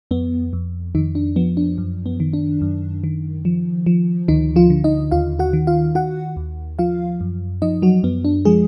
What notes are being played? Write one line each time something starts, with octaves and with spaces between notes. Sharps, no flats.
F2 B3
F2
F2 D#3 D#4
D4
F3 B3
D4
F#2
B3
D#3
D4
F#2
D#3
F3
F3
D2 D#3 D#4
F3 F4
D3
D#4 D#5
D#2 F4 F5
F#4 F#5
D#3
F4 F5
D#3 F#4 F#5
D#2
F3 F4 F5
F#2
F3 D#4 D#5
F#3 F#4
F#2 B3
D4
F3 G#3 G#4